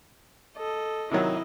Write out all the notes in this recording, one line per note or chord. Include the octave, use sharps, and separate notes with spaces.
A4 D#5
C3 D#3 F#3 E4 D#5